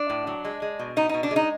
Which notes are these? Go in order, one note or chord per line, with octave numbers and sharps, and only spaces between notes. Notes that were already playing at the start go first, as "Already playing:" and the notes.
Already playing: D4
A2
F#3
G#3
G#3
B2
B3 D#4
B2 D#4
D4
G#3
D#4